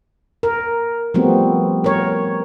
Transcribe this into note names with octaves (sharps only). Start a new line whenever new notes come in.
A#4
F3 G3 A3 B3 C4 F#4
A#4 C#5